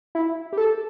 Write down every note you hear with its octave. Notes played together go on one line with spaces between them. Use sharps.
E4
G4
A4